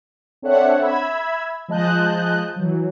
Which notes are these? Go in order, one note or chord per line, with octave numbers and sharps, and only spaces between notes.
C4 D4 A4 C#5 E5 F#5
E5 B5 E6 G#6
F3 G#3 D#5 A5 F#6 G6
E3 F#3